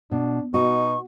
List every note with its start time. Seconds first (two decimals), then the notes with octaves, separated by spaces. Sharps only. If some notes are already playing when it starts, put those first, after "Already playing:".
0.11 B2 D4
0.54 B2 D#4 F#4 C#6